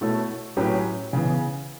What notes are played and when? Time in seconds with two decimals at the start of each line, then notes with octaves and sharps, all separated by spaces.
0.01 B2 A3 E4 A4 C#5
0.57 A2 F#3 C#4 G4 B4
1.13 C#3 E3 B3